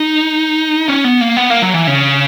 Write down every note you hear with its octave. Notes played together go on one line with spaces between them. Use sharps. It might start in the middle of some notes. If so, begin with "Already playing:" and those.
Already playing: D#4
C#4
B3
A#3
B3
A#3
F#3
E3
C#3